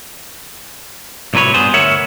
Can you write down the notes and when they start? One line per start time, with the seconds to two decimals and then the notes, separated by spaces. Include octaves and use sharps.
1.34 C2 A#2 F#3 B4 C#5
1.54 G2 B3 G#4 C5
1.74 D2 A#4 C#5 E5 F#5